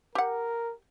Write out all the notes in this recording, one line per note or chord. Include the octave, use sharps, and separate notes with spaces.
G4 A#4 F#5